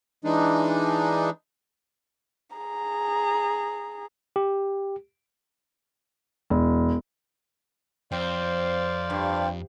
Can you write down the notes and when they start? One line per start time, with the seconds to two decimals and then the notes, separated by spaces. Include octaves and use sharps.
0.25 E3 G#3 D4 D#4
2.56 G#4 A#5
4.36 G4
6.50 E1
8.12 F2 C4 C5 D5 F5
9.10 G2